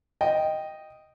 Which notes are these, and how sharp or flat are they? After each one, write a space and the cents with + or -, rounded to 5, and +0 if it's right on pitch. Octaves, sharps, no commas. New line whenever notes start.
D#5 +0 G5 +0